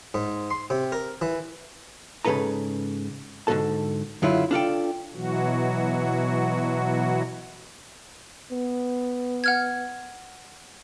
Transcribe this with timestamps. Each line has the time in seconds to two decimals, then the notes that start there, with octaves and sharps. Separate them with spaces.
0.14 G#2
0.51 C6
0.70 C3
0.92 A#4
1.21 E3
2.25 G#2 C#3 F3 A4 B4 A#5
3.47 G#2 D3 F3 F#4 A4 A5
4.22 F#2 D3 F#3 E4 F4
4.51 D4 F4 A4 G5
5.14 B2 E3 F#3 F#4
8.51 B3
9.44 F#5 F6 G#6